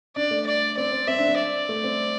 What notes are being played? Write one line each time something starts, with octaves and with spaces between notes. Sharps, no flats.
D4 D5
A3
D5
C4 D5
C4
C4 E5
D4
C4
D5
A3
C4